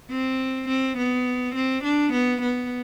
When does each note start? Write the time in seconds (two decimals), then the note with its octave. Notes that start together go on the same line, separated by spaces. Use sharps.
0.11 C4
0.69 C4
0.98 B3
1.55 C4
1.84 D4
2.13 B3
2.42 B3